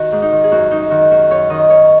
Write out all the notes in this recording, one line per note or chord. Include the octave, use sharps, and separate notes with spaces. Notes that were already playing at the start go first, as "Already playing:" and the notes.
Already playing: D#3 F#4
G#2
D#4
D#3
G#4
F#2 F#4
F#2 D#4
D#3 F#4
F#2 F#4
F#2 C#5
D#3 D#5
F#2 C#5